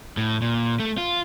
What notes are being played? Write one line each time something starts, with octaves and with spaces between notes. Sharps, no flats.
A2
A#2
A3
F4